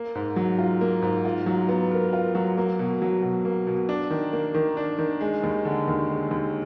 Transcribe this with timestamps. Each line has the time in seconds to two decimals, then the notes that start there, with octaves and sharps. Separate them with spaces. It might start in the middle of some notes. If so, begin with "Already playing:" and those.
Already playing: A#3
0.15 G#2
0.36 F#3
0.59 F4
0.81 A#3
1.02 G#2
1.25 F4
1.46 F#3
1.69 B3
1.91 A#4
2.13 F4
2.35 F#3
2.57 A#3
2.79 B2
3.02 F#3
3.22 B2
3.45 A#3
3.67 B2
3.89 D4
4.10 D#3
4.33 A#3
4.54 D#3
4.77 D4
4.98 D#3
5.21 G#3
5.43 D#2
5.65 D3
5.88 D#2
6.10 G#3
6.31 D#2